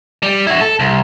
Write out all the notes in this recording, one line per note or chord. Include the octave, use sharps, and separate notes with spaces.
G3
E4 F#4
A4
C2